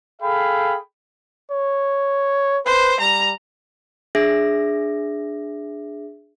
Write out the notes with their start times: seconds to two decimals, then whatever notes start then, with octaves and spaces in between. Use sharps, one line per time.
0.22 G#4 A4 F5 G5 B5
1.51 C#5
2.66 B4 C5
3.00 G3 A#5
4.15 D4 G#4 E5 A#6